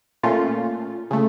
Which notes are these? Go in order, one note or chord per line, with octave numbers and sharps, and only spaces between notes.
A#2 A3 C#4 F4
C#3 A3